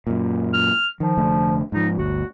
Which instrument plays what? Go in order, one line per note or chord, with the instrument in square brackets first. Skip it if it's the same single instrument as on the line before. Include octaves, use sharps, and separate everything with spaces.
[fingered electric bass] F#2 A#2
[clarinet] F6
[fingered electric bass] D#3 [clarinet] F3
[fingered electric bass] F1 D3 A3
[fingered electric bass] G#2 F3 [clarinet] D#4
[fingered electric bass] G1 D2 [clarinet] F#4